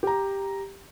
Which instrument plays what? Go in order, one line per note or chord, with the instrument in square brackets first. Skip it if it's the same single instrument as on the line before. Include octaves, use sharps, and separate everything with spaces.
[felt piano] G4 A#5